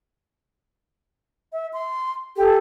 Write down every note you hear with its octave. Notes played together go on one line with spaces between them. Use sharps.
E5
C6
G4 A4